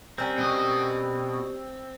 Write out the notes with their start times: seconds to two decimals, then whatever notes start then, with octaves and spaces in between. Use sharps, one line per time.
0.18 G3 C4 C#4 A#4
0.38 B2 D#5